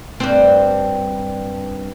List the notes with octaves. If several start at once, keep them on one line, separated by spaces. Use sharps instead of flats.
G2 C4